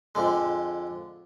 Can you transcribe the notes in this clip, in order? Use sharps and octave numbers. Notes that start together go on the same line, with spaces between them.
F2 D3 G#3